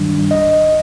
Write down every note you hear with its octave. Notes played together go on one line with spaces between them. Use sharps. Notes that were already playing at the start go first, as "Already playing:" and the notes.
Already playing: G2 D#3 G3 D4
C2 D#5